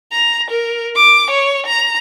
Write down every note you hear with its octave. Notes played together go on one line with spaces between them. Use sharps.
A#5
A#4
D6
C#5
A#5